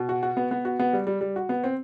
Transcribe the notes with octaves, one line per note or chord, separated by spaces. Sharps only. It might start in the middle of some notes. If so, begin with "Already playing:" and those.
Already playing: B2
F#4
F#4
B3
B3
F#4
B3
G3
G3
G3
F#4
B3
C4